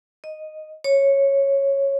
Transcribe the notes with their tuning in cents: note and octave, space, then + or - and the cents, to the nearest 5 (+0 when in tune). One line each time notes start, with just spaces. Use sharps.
D#5 -5
C#5 -10